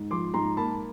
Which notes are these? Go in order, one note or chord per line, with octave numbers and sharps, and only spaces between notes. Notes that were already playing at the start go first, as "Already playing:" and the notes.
Already playing: G#2
F3 C6 D6
G#2 A#5 C6
A#3 A5 B5